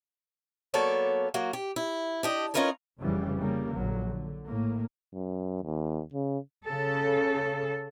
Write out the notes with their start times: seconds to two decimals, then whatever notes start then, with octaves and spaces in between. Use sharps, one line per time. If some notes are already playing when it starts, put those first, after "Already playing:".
0.74 F#3 A#3 B3 A4 C#5 D5
1.34 F#3 A#3 F#4
1.53 G4
1.76 E4
2.23 D4 G4 D#5
2.54 C#4 D#4 F4 A#4 B4 C#5
3.00 F1 C#3 E3 G3
3.38 C#3 G3 A#3
3.74 A#1 D3 F#3
4.06 D3
4.47 A2 A#3
5.14 F#2
5.63 D#2
6.14 C#3
6.66 C#3 A4